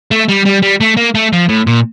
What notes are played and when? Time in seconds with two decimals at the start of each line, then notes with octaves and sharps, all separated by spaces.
0.11 A3
0.29 G3
0.45 G3
0.62 G3
0.81 A3
0.97 A#3
1.15 A3
1.33 F3
1.49 A2
1.67 A#2